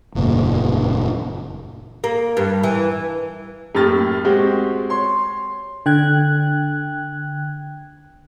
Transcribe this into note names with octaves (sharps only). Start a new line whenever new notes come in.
F#1 E2 A#2
A#3
G2
E3
F#2 A2 A#3 G4 F6 A6
G#3 C4 F#4 G4
C#5 C6
D3 G5 F#6 G#6